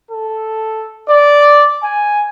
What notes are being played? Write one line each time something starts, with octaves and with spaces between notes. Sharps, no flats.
A4
D5
G#5